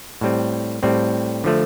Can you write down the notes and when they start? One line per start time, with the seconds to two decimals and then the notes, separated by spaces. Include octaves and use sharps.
0.21 A2 G3 C4
0.83 A2 G3 C4
1.44 D3 F3 A3